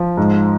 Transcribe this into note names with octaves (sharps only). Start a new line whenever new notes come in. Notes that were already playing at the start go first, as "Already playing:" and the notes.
Already playing: F3
G#2